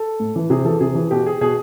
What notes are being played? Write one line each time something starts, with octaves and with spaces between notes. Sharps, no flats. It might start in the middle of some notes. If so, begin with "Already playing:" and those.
Already playing: A4
A2
E3
C3 G#4
E3 A4
C3 G#4
E3
B2 G4
G#4
B2 G#4